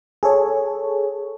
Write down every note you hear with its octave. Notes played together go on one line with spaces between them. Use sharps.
G#4 A4 C#5